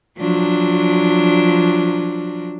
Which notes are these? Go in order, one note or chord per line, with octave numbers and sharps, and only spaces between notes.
F3 F#3 D4